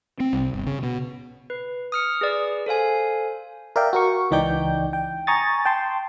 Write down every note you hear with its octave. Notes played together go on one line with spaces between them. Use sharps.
C4
C2
G1
C#3
B2
B4
D#6 F6 C#7
G#4 B4 D5
A4 C5 F5 G#5
A#4 D5 E5 F5 G5
F#4 A#4 C#6
C#2 E3 D#4 D5 G5 G6
G5
G#5 A#5 C#6 D#6 A6
G5 A5 C6